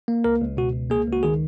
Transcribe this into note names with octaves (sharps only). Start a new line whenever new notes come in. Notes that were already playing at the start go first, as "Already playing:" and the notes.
A#3
C#2 A#4
C#2
B2 F#4
C#2
A#3 G#4
C#2
F#4
D#3 G#4